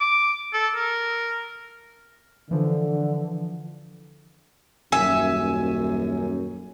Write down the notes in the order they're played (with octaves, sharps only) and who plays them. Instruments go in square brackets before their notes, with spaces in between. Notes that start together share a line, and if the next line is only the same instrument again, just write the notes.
[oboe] D6
A4
A#4
[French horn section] D3 [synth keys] E3 F3
[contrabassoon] D#1 [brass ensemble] F#2 [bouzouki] E5 [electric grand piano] G#5